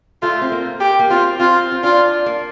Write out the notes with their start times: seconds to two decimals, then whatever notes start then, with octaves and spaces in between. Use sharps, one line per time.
0.22 A3 F4
0.41 C4
0.52 A#3
0.80 G4
0.99 A#3
1.10 C4 F4
1.40 C4 F4
1.72 C4
1.83 D4 F4
2.26 A#3